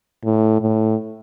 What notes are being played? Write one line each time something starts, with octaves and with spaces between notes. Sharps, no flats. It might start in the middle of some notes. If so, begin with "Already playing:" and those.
A2
A2